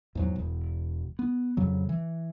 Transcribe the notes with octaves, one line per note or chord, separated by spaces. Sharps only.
E2 G#2 F#3
E1
B3
F2 C#3 F#3
E3